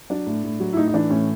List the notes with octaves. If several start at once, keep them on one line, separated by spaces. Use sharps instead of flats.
F#3 D4
A2
A2
F#3
E4
A2 D#4
D#4
E3 D4
A2 C#4